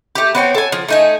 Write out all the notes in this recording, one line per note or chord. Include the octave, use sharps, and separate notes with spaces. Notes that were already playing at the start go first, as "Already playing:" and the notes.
A3 G4
B3 C4 C#5 G5
A4 G#5
F3
A3 D#4 G#5